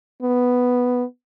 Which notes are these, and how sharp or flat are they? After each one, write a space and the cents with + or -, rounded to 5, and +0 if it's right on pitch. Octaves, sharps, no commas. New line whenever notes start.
B3 +0